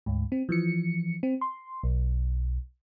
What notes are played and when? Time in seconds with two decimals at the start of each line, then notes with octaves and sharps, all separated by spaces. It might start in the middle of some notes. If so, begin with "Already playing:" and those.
0.06 D2 G#2
0.32 C4
0.49 E3 F3 C#7
1.23 C4
1.41 C6
1.83 B1